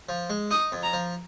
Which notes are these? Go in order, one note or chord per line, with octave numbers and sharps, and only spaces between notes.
F3
G#3
D#4 D#6
F2
A#5
F3